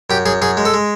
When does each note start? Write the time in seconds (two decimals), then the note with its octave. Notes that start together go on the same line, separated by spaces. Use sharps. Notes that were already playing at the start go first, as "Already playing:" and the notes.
0.10 F#2 G4
0.26 F#2 G#4
0.42 F#2 G#4
0.57 G#3
0.65 A4
0.74 G#3